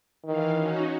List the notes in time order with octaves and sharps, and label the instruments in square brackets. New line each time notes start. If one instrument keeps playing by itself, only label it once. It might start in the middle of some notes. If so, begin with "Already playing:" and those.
[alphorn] D#3 [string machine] E3 F5
[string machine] C#4 D#4 F#4